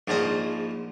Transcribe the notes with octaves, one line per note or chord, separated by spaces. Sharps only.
A#1 G#2 F3 A#5 D#6